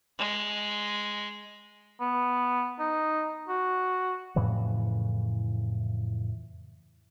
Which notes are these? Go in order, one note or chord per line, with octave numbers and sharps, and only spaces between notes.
G#3
B3
D#4
F#4
F2 A2 C#3 E3